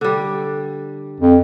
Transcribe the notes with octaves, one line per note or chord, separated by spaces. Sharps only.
D3 G3
F2